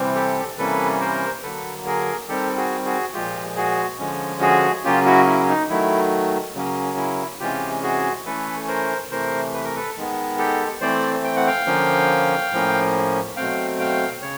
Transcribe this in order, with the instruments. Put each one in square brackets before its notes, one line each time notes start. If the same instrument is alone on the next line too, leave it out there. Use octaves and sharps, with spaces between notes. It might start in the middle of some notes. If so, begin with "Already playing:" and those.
Already playing: [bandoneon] C3 E3 G3 C4
G4 A4
C3 E3 G3 A#3 C#4 A4 B4
A#4 C5
D3 F#3 A#3 A4 B4
G#4 A#4
D#3 G3 C4 G4 A4
F#4 G#4
F#4 G#4
A#2 F3 G#3 F4 G4
F#4 G#4
D3 F3 G#3 C#4
F#4 G#4
C#3 F#3 A#3 C#4 F4 G4
E4 F#4
E4
D#4
D#3 F#3 A3 E4
C#3 F#3 A#3 C#4
E4
C3 E3 G#3 C#4 F4 G4
F#4 G#4
E3 A3 C#4 A4 B4
A#4 C5
C3 E3 A3 A#4 C5
B4
A#4
A4 B4
D#3 G#3 B3
G4 A4
E3 A3 C4 C5 D5
G5
F#5
F5 G5
D3 F3 A#3 C#4
A2 F3 A#3 C#4
B2 F#3 A3 C4 F5 G5
F5 G5
C#3 C#5